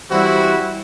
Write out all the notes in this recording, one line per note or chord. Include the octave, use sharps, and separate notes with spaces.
E3 G3 C4 E4 F#4